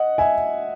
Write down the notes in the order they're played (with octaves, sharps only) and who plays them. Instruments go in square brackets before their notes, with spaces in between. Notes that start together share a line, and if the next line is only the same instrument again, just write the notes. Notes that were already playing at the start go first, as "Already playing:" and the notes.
Already playing: [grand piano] D#5 F#5
E5 G#5